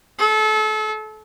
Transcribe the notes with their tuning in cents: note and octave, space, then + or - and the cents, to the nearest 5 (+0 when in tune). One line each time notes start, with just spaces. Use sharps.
A4 -30